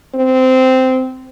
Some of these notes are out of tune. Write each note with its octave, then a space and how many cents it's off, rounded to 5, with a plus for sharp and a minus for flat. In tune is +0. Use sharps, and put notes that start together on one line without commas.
C4 -15